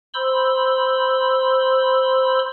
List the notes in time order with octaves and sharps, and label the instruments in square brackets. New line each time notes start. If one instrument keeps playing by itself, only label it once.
[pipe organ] C5 B5 C6 E6